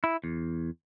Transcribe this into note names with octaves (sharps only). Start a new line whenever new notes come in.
E4
E2